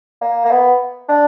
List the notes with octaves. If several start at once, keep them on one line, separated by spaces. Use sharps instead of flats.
A#3
A#3
B3
D4